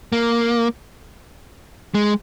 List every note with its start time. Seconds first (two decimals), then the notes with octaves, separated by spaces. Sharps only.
0.12 A#3
1.94 G#3